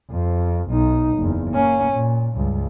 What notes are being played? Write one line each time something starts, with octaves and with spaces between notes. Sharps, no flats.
F2
B1 D#4
F#1 E2
A#3 C#4
A#2
C#2 G2